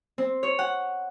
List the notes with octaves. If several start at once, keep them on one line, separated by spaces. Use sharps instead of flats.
C4
C#5
F#5